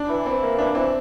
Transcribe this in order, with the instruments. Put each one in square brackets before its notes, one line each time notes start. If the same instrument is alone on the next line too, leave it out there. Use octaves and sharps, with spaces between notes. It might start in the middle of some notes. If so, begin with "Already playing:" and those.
Already playing: [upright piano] D4
[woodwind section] E3
[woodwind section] E3 [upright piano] C4
[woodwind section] A#3
[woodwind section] E3 [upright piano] D4
[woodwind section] E3 [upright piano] C4